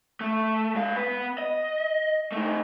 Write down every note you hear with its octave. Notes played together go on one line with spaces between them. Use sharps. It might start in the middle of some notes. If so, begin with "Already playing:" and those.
A3
G#2 F5
B3 B4
D#5
A3 D#4